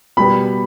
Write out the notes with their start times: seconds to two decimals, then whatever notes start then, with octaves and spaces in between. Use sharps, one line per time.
0.17 B2 G3 B3 B5